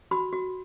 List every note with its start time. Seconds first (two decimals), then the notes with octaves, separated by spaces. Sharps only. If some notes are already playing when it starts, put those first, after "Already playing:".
0.11 F#4 B5
0.33 F#4